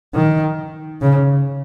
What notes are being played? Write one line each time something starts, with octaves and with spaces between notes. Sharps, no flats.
D#3
C#3